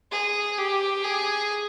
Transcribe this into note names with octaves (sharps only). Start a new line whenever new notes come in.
G#4
G4
G#4